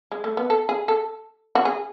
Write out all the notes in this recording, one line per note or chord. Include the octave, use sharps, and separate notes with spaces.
G#3
A3
B3
A4
G#4
A4
F#4
G#4